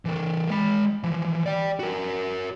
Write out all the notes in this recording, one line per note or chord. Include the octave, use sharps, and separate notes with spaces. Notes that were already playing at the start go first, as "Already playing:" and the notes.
E3 A#4
G#3 B5
E3 F3
D5 G5
F#4 A#4